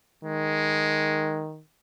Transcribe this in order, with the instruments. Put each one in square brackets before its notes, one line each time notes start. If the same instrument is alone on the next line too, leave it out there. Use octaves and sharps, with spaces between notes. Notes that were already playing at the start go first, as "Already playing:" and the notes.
[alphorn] D#3 [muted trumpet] G#3